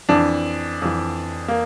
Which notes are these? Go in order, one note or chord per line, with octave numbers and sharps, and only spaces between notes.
F2 E3 D4
F2 E3
A#3